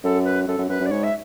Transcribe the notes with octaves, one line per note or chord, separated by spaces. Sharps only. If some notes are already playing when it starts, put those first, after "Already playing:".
F#2 A4
B4
F#2 A4
F#2
F#2 B4
F#2
D5
G#2 C#5
E5